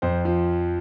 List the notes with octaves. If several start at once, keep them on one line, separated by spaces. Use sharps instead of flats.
F2 C5
F3